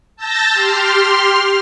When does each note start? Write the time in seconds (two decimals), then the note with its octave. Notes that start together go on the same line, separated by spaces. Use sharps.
0.16 A5 E6 G6 A6 A#6
0.49 G4 C6 F6